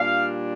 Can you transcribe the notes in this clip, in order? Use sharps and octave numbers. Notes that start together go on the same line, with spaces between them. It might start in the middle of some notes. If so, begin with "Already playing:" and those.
Already playing: A#2 G3 D4 F5